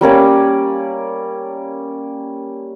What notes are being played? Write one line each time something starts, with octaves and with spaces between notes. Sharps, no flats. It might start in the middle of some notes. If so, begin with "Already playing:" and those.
G3 A#3 C#4 D5